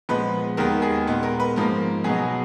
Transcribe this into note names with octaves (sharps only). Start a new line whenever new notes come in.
A#2 F3 G#3 B3 B4
D#2 D#3 G#3 B3 A#4
G#4
A#2 G#3 B3
A#4
B4
G#2 F3 A#3 A#4
B2 F#3 B3 G#4